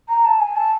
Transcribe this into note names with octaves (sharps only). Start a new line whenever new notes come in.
A#5
A5
G#5
A5